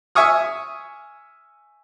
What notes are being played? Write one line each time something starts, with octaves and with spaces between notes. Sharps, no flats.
E5 G#5 C#6 D#6 F6